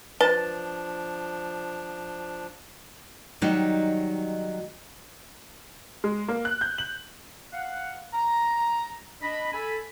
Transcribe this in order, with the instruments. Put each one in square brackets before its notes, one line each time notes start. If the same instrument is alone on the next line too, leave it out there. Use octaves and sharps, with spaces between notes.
[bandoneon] F3 D4 [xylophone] B4 [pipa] A5
[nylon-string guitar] D#3 F#3 G3 D#4
[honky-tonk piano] G#3
A#3
F#6
G6
F#7
[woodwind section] F5 F#5
A#5
D4 D#5 B5
A4 G#5 B5